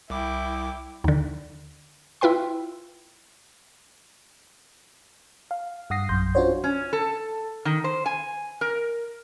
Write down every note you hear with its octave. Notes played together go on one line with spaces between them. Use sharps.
C2 E4 G5 D6
D#2 D3
E4 F4 B4 G5 C6
F5
G2 F#5 D#6 A#6 C7
A#1 F#2 C6 G6
C#4 D4 F4 F#4 C5 C#5
C#4
A4
D#3
C5
G#5
A#4